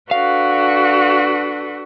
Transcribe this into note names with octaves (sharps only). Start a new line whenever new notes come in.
D4 F#4 A4 B4 F5